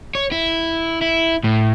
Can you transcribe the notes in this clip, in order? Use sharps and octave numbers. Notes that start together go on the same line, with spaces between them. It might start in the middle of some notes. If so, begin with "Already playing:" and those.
C#5
E4
E4
A2